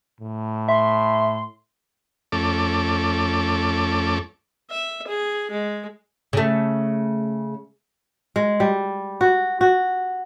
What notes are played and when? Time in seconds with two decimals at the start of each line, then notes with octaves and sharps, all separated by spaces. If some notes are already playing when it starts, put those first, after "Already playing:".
0.21 A2
0.68 E5 C6
2.32 F2 A3 C#4 A4 D6
4.71 E5
5.07 G#4
5.51 G#3
6.33 C#3 A3
8.36 G#3
8.60 G3
9.21 F#4
9.61 F#4